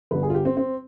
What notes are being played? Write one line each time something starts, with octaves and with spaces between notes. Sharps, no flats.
G1 G2 D3 B4
G#4
F4
G4
C4
C4